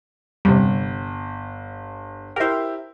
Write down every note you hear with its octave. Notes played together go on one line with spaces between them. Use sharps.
G1 C3 G3
E4 G4 A#4 C5